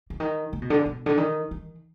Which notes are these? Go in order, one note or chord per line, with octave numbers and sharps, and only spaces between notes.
D3
D#3
D3
B2
D3
B2
D3
D#3
D#3